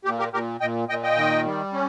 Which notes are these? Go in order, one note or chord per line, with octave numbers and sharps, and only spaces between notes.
A#2 G4
G4 A#4
A#2 G4 A#4
A#2 D#5 G5
A#2 D#5 G5
D#5 G5
D#3
G3
C#4